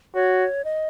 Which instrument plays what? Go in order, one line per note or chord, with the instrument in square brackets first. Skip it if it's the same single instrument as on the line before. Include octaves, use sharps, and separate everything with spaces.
[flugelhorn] F#4 [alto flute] C#5
[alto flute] D#5